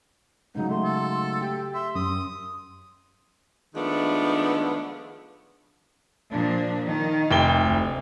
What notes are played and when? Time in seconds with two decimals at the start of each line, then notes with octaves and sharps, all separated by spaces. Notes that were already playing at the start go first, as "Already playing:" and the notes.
0.55 G#2 C#3 F#3 D#4
0.71 A3 C6
0.84 A4
1.41 G4 G5
1.74 E5 C6
1.95 F#2 D#6
3.74 D#3 F3 G#3 A3 B3 D4
6.30 A#2 F3 D4
6.85 D#3
7.31 F1 G5 G7
7.61 D2